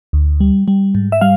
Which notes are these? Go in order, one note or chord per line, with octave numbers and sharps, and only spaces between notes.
D2
G3
G3
G#2
E5
G3 F5